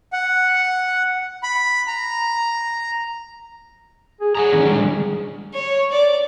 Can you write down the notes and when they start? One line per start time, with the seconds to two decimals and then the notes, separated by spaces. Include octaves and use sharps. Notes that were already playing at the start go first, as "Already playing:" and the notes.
0.13 F#5
1.43 B5
1.87 A#5
4.21 G#4
4.35 G#4 F#5 A5 A#5
4.52 D#3 E3 C#4
4.65 D3 G3 G#3
5.53 C#5
5.91 D5